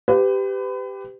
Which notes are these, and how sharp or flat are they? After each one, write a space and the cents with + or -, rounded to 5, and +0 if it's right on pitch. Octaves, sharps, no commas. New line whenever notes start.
G4 +0 B4 +35